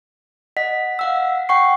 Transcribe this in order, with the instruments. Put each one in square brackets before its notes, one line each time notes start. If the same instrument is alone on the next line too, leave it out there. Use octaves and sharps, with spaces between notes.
[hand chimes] D#5 F#5 B6
F5 F#5 E6
F#5 G5 C#6 C7